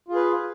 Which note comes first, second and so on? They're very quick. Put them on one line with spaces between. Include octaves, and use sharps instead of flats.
F4 G#4 B4